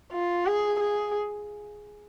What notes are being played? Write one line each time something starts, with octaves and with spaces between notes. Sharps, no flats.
F4
G#4
G#4